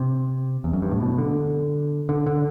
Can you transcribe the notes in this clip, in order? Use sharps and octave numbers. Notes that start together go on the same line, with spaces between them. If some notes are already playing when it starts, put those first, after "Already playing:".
Already playing: C3
E2
F#2
G2
A2
B2
D3
D3
D3